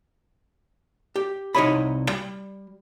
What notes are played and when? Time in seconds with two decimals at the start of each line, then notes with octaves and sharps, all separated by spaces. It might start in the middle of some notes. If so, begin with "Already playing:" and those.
1.16 G4
1.55 C2 D#4 E4 C#5 D#5 B5
2.09 G3